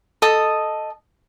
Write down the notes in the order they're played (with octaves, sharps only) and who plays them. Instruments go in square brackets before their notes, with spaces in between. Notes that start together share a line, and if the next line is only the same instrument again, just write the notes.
[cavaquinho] A4 D#5 D#6